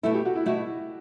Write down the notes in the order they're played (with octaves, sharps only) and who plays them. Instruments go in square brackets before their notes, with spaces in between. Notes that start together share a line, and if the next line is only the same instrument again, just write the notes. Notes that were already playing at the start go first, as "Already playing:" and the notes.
[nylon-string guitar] B2 A3 E4 [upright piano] A4
[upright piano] G4
F#4
E4
[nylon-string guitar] B2 A3 E4 [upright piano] F#4